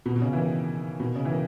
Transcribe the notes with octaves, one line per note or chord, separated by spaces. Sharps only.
B2
B2
C#3
E3
D#3
B2
C#3
E3
D#3